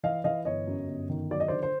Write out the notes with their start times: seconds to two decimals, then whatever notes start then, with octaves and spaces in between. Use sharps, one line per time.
0.03 E3 D#5 F5
0.24 E3 D#5 F5
0.45 G1 C#5 D#5
0.67 F#2
0.88 G1
1.09 D#3
1.31 F#3 D5
1.40 D#5
1.48 D3 C5 D5
1.63 C5